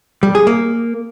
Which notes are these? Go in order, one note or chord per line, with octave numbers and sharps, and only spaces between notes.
G3
G#4
A#3